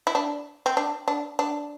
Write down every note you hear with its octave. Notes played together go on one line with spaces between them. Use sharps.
E4
D4
C4
D4
D4
D4